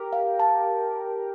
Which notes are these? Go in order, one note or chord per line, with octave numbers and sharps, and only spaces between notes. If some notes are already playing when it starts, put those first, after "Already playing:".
Already playing: G4 A#4
F5
A5